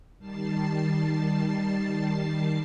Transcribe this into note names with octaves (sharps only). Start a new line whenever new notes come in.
D#3 G3 A5 A6 C7